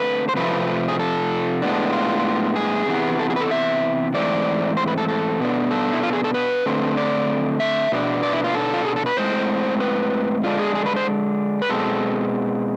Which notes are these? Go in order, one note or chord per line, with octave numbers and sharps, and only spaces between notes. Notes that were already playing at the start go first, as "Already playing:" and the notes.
Already playing: D3 A3 C4 B4
C5
C3 F3 A3 C4 B4
G#4
A4
A2 G#3 B3 D4
F4
G#4
C3 E3 B3
A4
G#4
B4
A4
E5
G#2 E3 A3 C4 D5
C5
B4
A4
A4
B2 B3 D4
A4
E4
F4
G#4
A4
B4
D3 A3 C4
D5
E5
B2 B3 D4
D5
E4
F4
A4
F4
G#4
A4
B4
A2 G#3 C4 C5
B4
D3 G#3 D4 F4
G#4
G#4
B4
C5
B4
B2 G#3 C4 A4